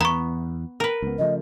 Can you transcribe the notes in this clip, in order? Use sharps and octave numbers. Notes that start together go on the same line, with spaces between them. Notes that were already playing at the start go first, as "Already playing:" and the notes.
E2 B3 A#5 C#6
A#4 B4
C#2 B3
C#3 F3 A3 D#5